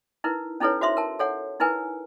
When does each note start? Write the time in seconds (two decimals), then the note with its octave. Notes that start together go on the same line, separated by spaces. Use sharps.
0.24 D#4 E4 A#4 B4
0.60 C#4 D#4 E4 A4 B4 C#5
0.81 F#4 C5 E5 C6
0.97 A#4 A5
1.19 A4 C#5 F#5
1.60 D#4 E4 A#4 B4 G#5